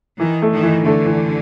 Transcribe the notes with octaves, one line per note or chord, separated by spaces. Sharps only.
D#3 E3
A3
D#3
E3
D3 A3
E3